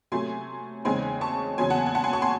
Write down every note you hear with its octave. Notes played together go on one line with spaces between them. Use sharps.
C3 F#3 A3 G#5 C6
E2 C#3 G#3 C4 D#4 G#5 C6
A5 C#6
E2 C#3 F#3 G#5 C6
F#5 A5
G#5
F#5 A5
G#5 C6
A5 C#6
G#5 C6